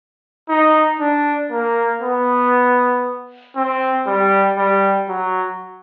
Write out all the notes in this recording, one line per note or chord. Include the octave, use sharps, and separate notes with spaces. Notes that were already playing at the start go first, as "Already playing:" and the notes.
D#4
D4
A#3
B3
C4
G3
G3
F#3